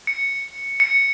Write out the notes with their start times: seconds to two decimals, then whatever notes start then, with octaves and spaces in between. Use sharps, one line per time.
0.07 C#7
0.80 C#7